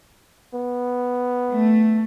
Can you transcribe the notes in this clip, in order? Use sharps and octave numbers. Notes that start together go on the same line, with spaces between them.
B3
A3